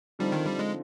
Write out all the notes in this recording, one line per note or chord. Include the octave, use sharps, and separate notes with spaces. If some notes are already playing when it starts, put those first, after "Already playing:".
D3 F3 G3 C4 D#4
D#3
G3
G#3